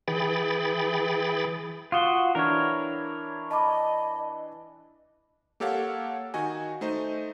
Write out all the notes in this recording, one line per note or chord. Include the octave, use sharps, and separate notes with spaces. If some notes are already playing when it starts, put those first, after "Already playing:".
E3 G#4 G5 B5 A6
F4 F#4 F5 D#6 G7
E3 D4 E4 A#4 C#5 F6
D#5 A5 B5 D6
A#3 G4 A4 C#5 F5 F#5
D#3 F#4 D#5 G#5
A3 D#4 C5 D#5